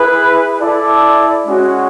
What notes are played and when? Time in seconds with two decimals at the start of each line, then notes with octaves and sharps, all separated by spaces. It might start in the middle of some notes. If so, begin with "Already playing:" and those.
Already playing: E4 G#4 B4
0.60 E4 A4 D5
1.46 G#3 C#4 F#4